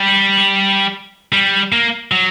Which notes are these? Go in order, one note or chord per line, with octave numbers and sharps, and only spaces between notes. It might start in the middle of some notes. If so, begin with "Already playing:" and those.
Already playing: G3
G3
A#3
F#3